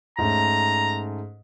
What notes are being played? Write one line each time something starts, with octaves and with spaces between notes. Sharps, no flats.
G#2 A3 C#4 A#5